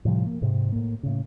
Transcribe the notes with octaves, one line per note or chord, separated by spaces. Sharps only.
A2 C3 F3 G3
A#3
G#2 C3
A2 A#3
A2 C#3